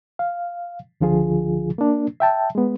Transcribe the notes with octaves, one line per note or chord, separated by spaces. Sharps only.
F5
C#2 D3 F3 F4 G#4
A#3 D4
E5 G5 A5
G#3 B3